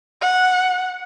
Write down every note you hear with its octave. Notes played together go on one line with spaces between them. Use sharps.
F#5